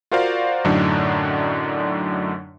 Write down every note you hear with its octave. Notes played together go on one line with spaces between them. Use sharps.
F4 F#4 A#4 C5 D5 F5
F#2 A2 D3 F#3 D4 D#4